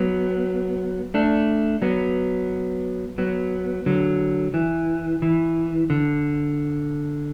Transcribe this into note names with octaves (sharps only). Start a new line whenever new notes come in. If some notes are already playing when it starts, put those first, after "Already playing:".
Already playing: F#3 B3
A3 D4
F#3 B3
F#3 B3
D3 F#3
E3
E3
D3